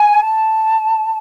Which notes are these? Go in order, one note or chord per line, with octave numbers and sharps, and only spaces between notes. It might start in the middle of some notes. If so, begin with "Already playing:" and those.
Already playing: G#5
A5